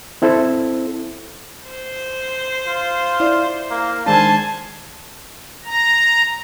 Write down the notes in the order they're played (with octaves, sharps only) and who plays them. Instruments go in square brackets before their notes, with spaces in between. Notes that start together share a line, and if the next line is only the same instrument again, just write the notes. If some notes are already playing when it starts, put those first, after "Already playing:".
[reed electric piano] C4 E4 A4 C5
[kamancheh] C5
[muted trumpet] F4
[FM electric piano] E4 D5
[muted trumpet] A#3
[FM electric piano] D#3 G#3 D4 [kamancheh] C5 G#5 [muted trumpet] A5
[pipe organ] A#5